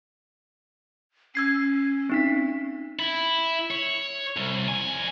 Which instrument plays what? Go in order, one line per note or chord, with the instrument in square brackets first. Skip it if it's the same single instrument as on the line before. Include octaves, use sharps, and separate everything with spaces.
[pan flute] C#4 [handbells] E6 G#6 C7
[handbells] C4 D#4 B6
[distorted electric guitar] E4
C#5
C2
F2 G#5